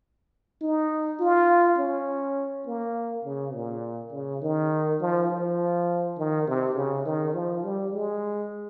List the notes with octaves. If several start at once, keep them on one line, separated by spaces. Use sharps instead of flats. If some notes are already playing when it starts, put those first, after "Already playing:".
D#4
F4
C#4
A#3
C#3
A#2
C#3
D#3
F3
F3
D#3
C3
C#3
D#3
F3
G3
G#3